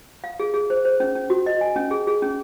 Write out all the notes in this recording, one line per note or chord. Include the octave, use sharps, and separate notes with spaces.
F5
G#4
G#4
C5
C5
C#4
C#4
F#4
D#5
G#5
C#4
G#4
G#4
C#4